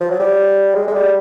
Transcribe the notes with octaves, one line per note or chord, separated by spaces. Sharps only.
F3
F#3
G3
G#3
G#3
G3